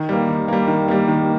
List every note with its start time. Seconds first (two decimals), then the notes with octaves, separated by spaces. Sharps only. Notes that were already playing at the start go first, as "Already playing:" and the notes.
Already playing: D#3
0.09 G3 A#3
0.29 D#3
0.48 G3 A#3
0.68 D#3
0.88 G3 A#3
1.08 D#3